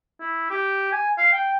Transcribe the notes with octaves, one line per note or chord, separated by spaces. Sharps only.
E4
G4
G#5
F5
G5